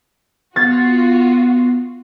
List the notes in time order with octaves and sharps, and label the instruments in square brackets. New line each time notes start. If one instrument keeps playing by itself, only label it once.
[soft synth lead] B3 [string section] F4 F#4 [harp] G#6 A6